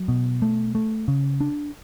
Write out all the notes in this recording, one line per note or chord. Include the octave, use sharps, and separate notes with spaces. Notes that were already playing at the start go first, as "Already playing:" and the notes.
Already playing: F#3
B2
A3
A3
C#3
D4